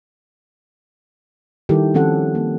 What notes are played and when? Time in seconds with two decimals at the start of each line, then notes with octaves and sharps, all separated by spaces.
1.69 D#3 G3 E4 G4 A4
1.94 D#3 F3 C4 C#4 A4 F#5
2.35 A#3